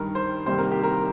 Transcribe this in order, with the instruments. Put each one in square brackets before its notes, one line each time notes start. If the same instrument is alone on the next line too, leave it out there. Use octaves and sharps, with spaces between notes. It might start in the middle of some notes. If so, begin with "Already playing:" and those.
Already playing: [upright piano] G2 D#3 G3 A#4
C5
C2 C3 D#3 G3 A#3 C5
A#4
G4
A#4